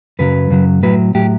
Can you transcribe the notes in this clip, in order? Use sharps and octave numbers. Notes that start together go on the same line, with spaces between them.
F#2 C#3 F#3 B4
F#2 C#3 F#3
A2 F#3 B4
A2 F#3 G4